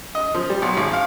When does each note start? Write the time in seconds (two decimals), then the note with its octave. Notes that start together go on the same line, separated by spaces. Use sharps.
0.15 D#5
0.34 F3
0.50 G3
0.62 B1
0.77 G#1
0.93 F5